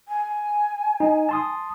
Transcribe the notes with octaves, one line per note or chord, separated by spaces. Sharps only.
G#5
D#4
A5 C6 D#6